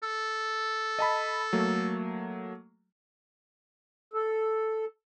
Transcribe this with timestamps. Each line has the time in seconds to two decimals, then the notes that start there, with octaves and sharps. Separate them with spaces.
0.03 A4
0.99 D#5 A5 B5
1.53 F#3 A3 A#3
4.14 A4